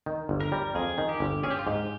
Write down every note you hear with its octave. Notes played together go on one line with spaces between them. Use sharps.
D#3
G1
A#4
G3
F2 G#4
D#3
G4
G1
C#4 G#4
G4
F4
G#2 G4